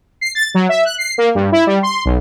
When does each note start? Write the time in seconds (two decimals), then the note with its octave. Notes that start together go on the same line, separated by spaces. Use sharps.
0.21 C7
0.35 A6
0.55 F#3
0.69 E5
0.85 F#6
0.98 C7
1.18 A#3
1.35 G2
1.52 E4
1.67 G3
1.83 C6
2.05 B1